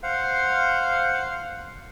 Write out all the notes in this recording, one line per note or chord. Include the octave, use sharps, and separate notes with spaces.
C5 F5 F#5